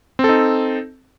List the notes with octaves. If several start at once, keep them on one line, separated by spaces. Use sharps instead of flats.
C4 D#4 A4